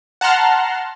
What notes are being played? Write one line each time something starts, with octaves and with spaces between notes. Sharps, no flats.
F#5 A5 A#5 C6 F6